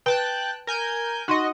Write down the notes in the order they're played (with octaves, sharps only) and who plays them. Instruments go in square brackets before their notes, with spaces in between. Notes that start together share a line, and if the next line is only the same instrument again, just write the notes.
[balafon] B4 [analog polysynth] G5 A5 F#6
[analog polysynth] A#4 G#5 G6
[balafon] D#4 C6 [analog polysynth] F#4 D#5